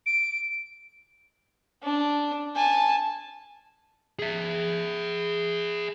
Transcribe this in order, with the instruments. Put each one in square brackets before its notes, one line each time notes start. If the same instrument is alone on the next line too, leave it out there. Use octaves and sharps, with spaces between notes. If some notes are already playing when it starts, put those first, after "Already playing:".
[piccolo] D7
[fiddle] D4
G#5 A5
[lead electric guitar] G#4 E5